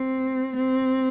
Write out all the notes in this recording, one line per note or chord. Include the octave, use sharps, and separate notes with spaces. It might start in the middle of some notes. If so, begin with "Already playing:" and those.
Already playing: C4
C4